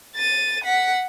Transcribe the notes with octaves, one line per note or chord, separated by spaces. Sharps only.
A6 D#7
F#5 B6